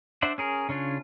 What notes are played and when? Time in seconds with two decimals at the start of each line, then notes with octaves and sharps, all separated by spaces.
0.22 D4 C5 D5 E5 F#5
0.38 C#4 G#4 A#4
0.69 C#3 C#4 D4 F4